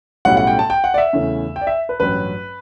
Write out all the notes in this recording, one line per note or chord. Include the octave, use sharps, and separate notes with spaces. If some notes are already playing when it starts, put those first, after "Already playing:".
B1 A2 G3 C#4 F#5
F#5
G5
A5
G5
F#5
D5
E5
E2 C#3 E3 A3 C#4
G5
D5
E5
B4
A1 G2 F#3 C#4 B4